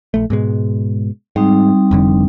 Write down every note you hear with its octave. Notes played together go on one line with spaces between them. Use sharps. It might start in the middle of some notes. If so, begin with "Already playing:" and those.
A#1 A3
G#2 B2 G#3
G#2 G3 C4 D#4
F1 F2 D3